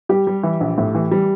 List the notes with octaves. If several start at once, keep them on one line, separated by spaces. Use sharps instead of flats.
G3 G4
G3
E3
A#1
A2
E3
G3